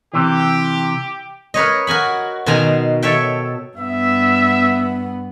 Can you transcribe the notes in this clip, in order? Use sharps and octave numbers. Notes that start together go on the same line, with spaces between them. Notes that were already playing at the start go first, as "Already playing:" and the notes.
C3 E3 G4
A#4 B4 C#5 D#5
F#4 A#4 G#5 B5
B2 D#3 C5 G#5 A#5
A4 C#5 E5 G5
G2 B3 E5